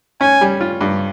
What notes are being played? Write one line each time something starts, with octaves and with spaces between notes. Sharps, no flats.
C#4 G#5
G3
F4
G2